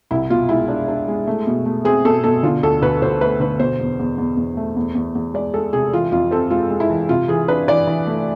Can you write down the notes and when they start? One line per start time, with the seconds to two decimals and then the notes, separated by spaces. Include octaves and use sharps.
0.11 C2 E4
0.30 B2 F4
0.49 G#3 E4
0.68 D4
0.88 D4
1.08 G#3
1.27 A3
1.47 B2
1.66 A3
1.85 C4 G#4
2.05 B2 A4
2.24 B2 A4
2.43 D3 F4
2.63 D2 A4
2.82 D2 B4
3.02 D2 C5
3.21 A3 B4
3.40 D3 B4
3.59 B2 C5
3.79 E2
3.99 E2
4.18 E2
4.37 E2
4.57 A3
4.76 E2
4.95 E2
5.15 E2
5.34 G#3 D5
5.53 G#3 A4
5.73 C3 G#4
5.93 E3 F4
6.12 F2 F4
6.31 C4 A4
6.51 G#3 F4
6.70 G#3
6.80 E4
6.90 E3
7.09 C3 F4
7.28 E3 G#4
7.48 D4 B4
7.68 E3 D5
7.87 E3
8.07 A3